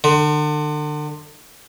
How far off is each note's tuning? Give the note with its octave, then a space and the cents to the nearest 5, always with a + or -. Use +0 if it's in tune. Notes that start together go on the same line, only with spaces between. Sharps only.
D3 +35